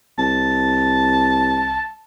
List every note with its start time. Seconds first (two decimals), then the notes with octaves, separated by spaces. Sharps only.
0.19 C2 A5